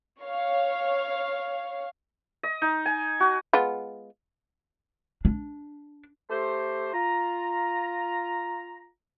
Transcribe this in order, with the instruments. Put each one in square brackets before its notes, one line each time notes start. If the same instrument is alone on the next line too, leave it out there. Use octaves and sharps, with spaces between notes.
[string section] C#5 F5
[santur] D#5
D#4
G#5
F#4
[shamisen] G#3 B3 F4
[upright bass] D4
[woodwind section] A3 G4 C5
F4 A#5